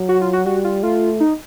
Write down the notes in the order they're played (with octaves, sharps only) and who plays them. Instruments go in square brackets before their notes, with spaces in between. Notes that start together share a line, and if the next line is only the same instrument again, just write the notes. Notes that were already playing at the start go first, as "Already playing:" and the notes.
Already playing: [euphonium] F#3
[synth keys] F#4
F4
F#4
[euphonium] G3 [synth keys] F#4
[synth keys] F4
[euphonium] A3 [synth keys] F4
[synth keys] D#4